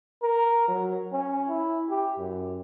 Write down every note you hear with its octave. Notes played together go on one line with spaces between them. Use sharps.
A#4
F#3
C#4
E4
G4
F#2